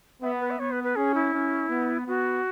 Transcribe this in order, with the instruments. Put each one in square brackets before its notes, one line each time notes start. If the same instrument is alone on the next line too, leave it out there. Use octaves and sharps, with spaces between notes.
[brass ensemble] B3 [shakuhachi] E5
[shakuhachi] B4
E5
[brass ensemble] B3 [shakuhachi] C#5
[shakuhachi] B4
B4
[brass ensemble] C#4 [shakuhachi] G#4
[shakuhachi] E4
[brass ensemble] C#4
B3
[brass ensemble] B3 [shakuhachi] F#4